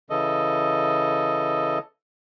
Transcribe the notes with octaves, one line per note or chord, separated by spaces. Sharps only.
C#3 E3 A4 D#5